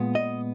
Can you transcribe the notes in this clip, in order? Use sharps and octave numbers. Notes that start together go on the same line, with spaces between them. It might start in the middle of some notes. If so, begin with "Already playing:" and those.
Already playing: A#2 G#3 B3
D#5